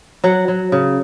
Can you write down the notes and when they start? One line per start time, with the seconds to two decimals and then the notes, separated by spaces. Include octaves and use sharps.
0.24 F#3 F#5
0.48 F#3
0.72 C#3